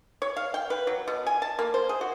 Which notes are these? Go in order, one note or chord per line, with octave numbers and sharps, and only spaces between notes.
C#5
F5
G5
B4
F#3
B2
G#5
A5
A#3
C5
G#4
F#4